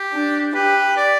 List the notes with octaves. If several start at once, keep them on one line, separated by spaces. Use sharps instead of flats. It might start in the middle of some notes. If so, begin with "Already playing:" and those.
Already playing: G4
D4
G4 B4
D5